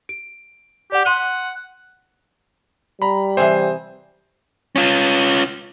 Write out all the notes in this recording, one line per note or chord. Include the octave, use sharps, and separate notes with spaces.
D7
G4 D5 F#5
F#5 C6 D#7 G7
G3 A#5 B5
C3 E3 G#4 C5 G#5
C#4 F4